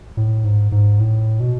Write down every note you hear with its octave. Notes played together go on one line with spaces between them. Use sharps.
A2
G#2
G#2
A2
B2